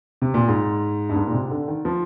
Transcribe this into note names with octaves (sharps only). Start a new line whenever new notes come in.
C3
A#2
G#2
G2
G#2
A#2
C3
D3
D#3
F3